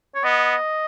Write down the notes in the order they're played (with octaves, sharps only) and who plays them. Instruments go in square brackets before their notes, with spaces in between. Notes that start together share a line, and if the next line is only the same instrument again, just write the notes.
[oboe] C#5
[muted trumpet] B3 [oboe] D#5